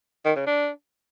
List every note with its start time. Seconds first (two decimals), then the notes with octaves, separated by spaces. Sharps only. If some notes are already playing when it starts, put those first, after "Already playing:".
0.25 D#3
0.36 C#3
0.47 D4